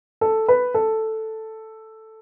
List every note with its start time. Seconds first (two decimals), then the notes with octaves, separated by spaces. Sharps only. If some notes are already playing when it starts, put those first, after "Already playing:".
0.21 A4
0.48 B4
0.74 A4